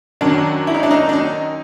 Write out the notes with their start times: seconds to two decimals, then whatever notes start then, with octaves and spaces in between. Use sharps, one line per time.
0.21 F#2 D#3 F#3 D4
0.67 E4
0.74 D#4
0.83 D4
0.91 D#4
1.09 D4
1.13 D#4